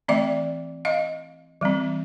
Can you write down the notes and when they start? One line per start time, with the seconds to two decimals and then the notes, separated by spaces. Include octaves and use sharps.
0.08 E3 A3 C4 D5 E5
0.85 D#5 F5
1.61 E3 G3 C4